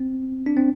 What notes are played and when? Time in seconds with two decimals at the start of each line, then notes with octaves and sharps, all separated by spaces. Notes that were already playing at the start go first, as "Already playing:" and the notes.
Already playing: C4
0.46 D4
0.57 C4